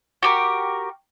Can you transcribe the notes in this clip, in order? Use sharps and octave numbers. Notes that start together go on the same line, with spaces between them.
F#4 G4 A#4